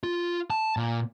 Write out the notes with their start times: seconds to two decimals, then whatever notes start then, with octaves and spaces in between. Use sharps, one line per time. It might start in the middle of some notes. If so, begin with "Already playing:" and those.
0.04 F4
0.50 A5
0.77 A#2